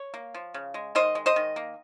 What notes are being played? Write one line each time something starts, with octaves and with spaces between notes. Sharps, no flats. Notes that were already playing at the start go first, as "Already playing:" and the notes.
Already playing: C#5
A#3
F3
C#3
G#3
D#3 C5 D#5
G#3
C5 D#5
D#3
A#3